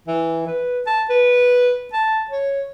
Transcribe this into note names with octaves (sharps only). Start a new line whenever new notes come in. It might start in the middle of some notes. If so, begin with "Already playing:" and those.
E3
B4
A5
B4
A5
C#5